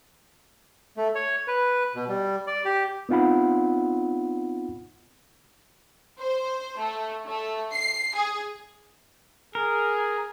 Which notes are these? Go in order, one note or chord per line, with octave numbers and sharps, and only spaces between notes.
A3
C#5
B4
B2
G3
D5
G4
B3 C4 D#4 F4 F#5 B5
C5
A3
A3
C7
G#4
G#4 A#4